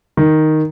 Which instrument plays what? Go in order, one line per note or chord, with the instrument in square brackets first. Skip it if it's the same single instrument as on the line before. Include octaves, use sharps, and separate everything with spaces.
[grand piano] D#3